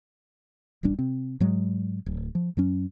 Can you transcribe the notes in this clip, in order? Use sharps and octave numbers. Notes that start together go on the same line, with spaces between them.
D#1 A1 G3 D4
C3 C4
G#2 F#3 G#3
D1
F3
F#2 F#3 C#4